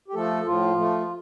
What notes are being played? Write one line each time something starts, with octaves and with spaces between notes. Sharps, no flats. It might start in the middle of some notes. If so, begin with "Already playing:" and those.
G4
F3 A3 A4
A2 F3 F4
F3 A3